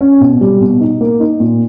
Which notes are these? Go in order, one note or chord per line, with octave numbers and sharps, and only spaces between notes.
C#4
B2
G3
B2
D#4
A#3
D#4
A#2